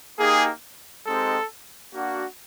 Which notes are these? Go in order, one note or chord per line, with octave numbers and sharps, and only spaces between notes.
A#3 D#4 G4 G#4
G#3 C4 D#4 G4 A4
A#3 D4 F#4